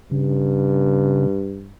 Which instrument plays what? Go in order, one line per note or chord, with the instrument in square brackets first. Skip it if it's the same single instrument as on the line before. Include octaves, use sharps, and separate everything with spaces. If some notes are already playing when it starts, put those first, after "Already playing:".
[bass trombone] G2 [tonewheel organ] C#3